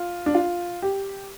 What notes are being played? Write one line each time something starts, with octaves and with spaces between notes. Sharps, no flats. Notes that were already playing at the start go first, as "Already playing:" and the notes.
Already playing: F4
D4
F4
G4